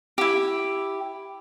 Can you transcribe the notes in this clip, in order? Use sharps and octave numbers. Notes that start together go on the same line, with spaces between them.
E4 G4